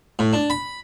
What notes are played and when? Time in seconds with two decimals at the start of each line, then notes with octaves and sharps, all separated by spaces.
0.19 A2
0.33 D4
0.50 B5